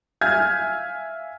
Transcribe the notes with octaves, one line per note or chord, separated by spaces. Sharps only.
E5 F5 G#5 F6 G#6